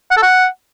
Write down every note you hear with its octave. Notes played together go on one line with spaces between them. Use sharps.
F#5
A4
F#5